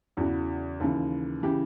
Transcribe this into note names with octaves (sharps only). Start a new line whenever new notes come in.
E2 C#3 E3 F#4
D#2 C#3 E3
C#3 E3 G4